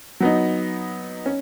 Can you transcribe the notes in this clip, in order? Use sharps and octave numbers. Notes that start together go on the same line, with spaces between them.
F#3 B3 D#4
C#4